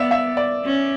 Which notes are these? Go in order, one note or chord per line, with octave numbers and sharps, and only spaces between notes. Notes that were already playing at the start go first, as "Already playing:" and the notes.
Already playing: B3 D5 E5
E5
D5
C#4